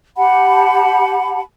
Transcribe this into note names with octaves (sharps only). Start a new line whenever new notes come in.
G4 F#5 A5 B5